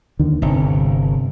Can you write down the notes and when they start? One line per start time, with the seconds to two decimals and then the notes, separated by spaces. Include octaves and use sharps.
0.19 D#2 D3 D#3
0.42 G1 C3